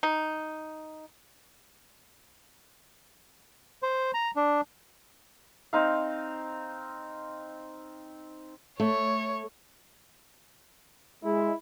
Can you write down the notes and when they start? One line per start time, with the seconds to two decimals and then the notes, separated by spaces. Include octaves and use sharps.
0.03 D#4
3.83 C5
4.14 A#5
4.36 D4
5.73 C4 D#4 F5
8.80 A3 C#5
11.24 G#3 E4